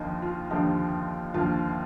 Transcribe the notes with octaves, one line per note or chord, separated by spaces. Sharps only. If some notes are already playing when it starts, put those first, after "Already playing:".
Already playing: D#2 D3 F3 D#4 F4
F4
D#2 D3 F3 D#4 G4
D#2 D3 F3 F4